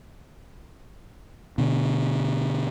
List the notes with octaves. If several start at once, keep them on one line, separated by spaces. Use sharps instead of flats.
B2 D3